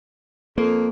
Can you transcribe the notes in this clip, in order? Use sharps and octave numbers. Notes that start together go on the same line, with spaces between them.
F2 A#3